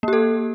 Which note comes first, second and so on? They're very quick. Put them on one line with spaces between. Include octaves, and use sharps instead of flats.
A#3 G4 A4